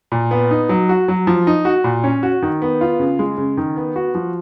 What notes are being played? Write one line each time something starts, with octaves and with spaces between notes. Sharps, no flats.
A#2
B3
D#4
F#3
F#4
F#3
F3
D#4
F#4
A#2
C#4
F#4
D#3
B3
F4
C#3
G#3
C#3
D#3
B3
F#4
F3